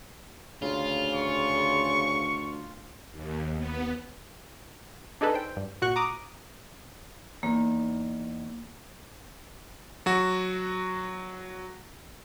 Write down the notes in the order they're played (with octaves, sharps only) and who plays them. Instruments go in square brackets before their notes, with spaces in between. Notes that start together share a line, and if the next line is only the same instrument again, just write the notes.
[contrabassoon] D2 [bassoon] C#3 [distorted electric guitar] F4
[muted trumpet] C#6
[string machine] D#2
B3
[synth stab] D4 D#4 G#4 A4 B4
C5 G5
G2
A#2 F#4 F#5 C#6 F#6
A#5 D6 D#6
[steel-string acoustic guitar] E2 D#4 [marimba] A#3
[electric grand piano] F#3 F#4